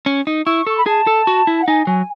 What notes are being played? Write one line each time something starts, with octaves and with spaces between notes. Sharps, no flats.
C#4
D#4
E4 C#6
A4 C#6
B5
G#4 A5
A4
F#4
E4
F#5
D#4 G#5
F#3 G#5